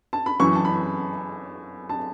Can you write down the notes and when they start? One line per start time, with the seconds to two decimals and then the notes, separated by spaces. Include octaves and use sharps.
0.13 A5
0.26 B5
0.40 F#2 E3 C#6
0.55 A5
0.65 B5
1.89 A5